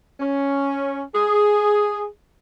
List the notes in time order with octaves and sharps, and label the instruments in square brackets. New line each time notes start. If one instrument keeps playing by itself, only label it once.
[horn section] C#4
G#4